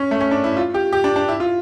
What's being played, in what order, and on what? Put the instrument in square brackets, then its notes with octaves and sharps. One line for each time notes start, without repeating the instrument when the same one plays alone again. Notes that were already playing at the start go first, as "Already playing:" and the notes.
Already playing: [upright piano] C#4
A3
C#4
D4
E4
F4
G4
G4
D4
D4
E4
F4